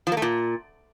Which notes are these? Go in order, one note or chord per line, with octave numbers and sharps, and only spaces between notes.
F3
A#3
A3
A#2